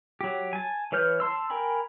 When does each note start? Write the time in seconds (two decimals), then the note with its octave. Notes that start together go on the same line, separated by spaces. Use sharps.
0.21 F#3 G4
0.53 G#5 A5
0.92 E3 B4 C#5 F6 G6
1.20 A5 C6 E6
1.50 A#4 G5 G#5 A#5 B5